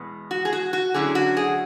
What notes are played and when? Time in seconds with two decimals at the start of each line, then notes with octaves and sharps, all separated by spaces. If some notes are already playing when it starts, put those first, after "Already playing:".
Already playing: E2 B2 G#3 B3
0.31 F#4
0.45 G#4
0.53 F#4
0.73 F#4
0.94 D3 F#3 A3 C#4 E4 G#4
1.15 F#4
1.37 G#4